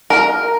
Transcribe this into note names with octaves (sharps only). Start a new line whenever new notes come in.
A#4